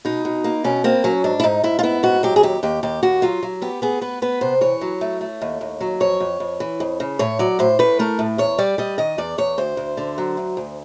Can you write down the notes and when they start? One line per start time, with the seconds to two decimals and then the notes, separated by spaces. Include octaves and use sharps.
0.05 B2 D#4
0.25 B2
0.44 A#3
0.64 B2 C#4
0.84 A#3 C4
1.04 F#3 C#4
1.24 G#2 D4
1.40 E4
1.44 G#2 D#4
1.63 G#2 E4
1.79 F4
1.83 B3 E4
2.03 G#2 F#4
2.23 F#3 G4
2.36 G#4
2.43 D#2 G4
2.63 D#2 G4
2.83 D#2 G4
3.03 D#2 F#4
3.22 F#3 F4
3.43 F#3
3.62 B3 G4
3.82 B3 G#4
4.01 B3 B4
4.22 B3 B4
4.41 C3 C5
4.61 E3 C#5
4.81 F#3
5.01 A3
5.21 A3
5.41 D#2
5.61 D#2
5.81 F#3
6.00 F2 C#5
6.20 F2
6.40 F2
6.60 E3
6.80 F2
7.00 C#3
7.19 A2 C#5
7.39 F#3 D5
7.59 A2 C5
7.79 A2 B4
7.99 A3 A#4
8.19 A2
8.38 E2 C#5
8.58 G3 D5
8.78 G3 D#5
8.98 D#3 D#5
9.18 E2 D5
9.38 E2 C#5
9.58 D2 C5
9.77 D2
9.97 D3
10.18 F#3
10.37 D2
10.57 D2